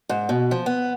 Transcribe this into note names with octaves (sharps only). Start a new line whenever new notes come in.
G#2
B2
F3
B3